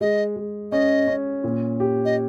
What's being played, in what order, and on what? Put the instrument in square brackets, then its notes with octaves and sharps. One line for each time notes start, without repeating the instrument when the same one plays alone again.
[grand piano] G#3 [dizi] D#5
[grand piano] G#3
[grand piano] C#4 [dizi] D#5
[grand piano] C#4
A#2
G4
[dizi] D#5